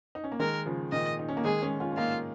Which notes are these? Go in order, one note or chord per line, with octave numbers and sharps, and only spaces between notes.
D#4
C#4
A#3
D#3 G#3 A#4
C#3 F3
A#2 D#3 D#5
D#4
C#4
A#3
D#3 G#3 G#4
G#3 C#4
C#4 F4
C#4
A#3 D#4 F4